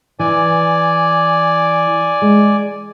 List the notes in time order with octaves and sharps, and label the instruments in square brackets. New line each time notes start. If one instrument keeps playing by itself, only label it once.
[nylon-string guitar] E3 [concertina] D5 G#5
[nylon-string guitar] G#3